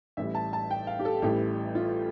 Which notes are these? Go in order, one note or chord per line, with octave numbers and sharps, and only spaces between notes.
A1 A2 E3 G3 E5
A5
A5
G5
F5
G4
A4
A1 A2 E3 G3 G4
F4